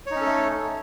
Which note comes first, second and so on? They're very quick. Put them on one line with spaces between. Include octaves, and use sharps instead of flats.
C#5 D#4 C#4 A4 A3